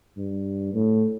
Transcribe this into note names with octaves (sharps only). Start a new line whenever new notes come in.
G2
A2